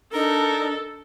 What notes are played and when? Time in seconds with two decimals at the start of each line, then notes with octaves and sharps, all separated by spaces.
0.13 D4 D#4 A4 A#4